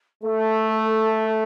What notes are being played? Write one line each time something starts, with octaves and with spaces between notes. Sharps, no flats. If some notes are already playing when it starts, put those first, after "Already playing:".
A3 A4